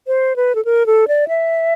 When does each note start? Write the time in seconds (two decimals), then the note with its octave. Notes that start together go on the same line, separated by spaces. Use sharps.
0.07 C5
0.36 B4
0.55 A4
0.65 A#4
0.86 A4
1.08 D5
1.28 E5